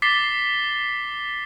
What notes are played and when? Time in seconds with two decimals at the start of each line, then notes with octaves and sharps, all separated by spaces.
0.02 D6 A6 B6 C7 G7